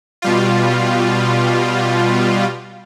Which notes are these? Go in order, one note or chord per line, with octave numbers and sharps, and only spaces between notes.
B2 G3 F4